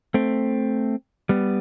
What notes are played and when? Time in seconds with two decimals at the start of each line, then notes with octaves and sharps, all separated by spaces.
0.14 A3 C4
1.29 G3 B3